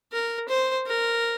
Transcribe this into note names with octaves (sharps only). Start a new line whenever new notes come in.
A#4
C5
A#4